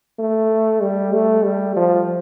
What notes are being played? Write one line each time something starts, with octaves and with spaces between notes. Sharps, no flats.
A3
G3
A3
G3
F3